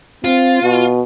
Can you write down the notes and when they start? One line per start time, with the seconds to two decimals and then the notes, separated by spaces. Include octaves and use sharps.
0.24 C4 F4
0.63 B2